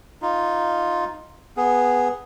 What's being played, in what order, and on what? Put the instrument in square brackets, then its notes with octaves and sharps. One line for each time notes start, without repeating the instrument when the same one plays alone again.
[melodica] D#4 F4
B3 G#4